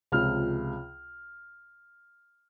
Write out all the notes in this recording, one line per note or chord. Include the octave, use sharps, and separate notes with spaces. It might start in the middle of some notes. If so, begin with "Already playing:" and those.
C#2 C3 F3 F6